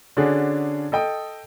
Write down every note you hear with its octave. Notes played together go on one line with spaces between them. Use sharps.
D3 C#4 D4 F#4 G#4
A4 D#5 G5 D#6